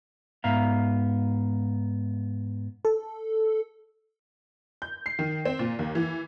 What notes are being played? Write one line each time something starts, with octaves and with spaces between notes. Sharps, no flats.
G#2 B3 E5 F5 A#5
A4
G6
C7
D#3
C4
A#2
D#2
E3